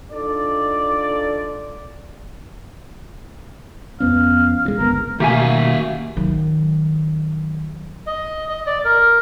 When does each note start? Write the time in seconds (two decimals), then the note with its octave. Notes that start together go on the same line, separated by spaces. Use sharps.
0.11 D4 D#4 F4 A4 D5
4.00 F2 B3 C#4 F5
4.65 E3 G#3
4.79 G1 D2 B3 A#4
5.20 B2 D#3 A3 A#3 G4 E5 F5 G#5
6.17 D#3 F#3
8.07 D#5
8.49 D#5
8.67 D5
8.85 A#4